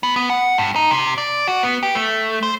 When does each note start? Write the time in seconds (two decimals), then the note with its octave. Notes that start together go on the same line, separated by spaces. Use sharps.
0.03 B3
0.16 B3
0.30 F#5
0.58 G2
0.76 D#4
0.91 C3
1.18 D5
1.48 F#4
1.63 B3
1.83 G4
1.95 A3
2.43 C5